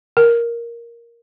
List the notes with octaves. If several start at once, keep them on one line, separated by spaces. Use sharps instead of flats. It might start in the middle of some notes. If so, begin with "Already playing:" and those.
A#4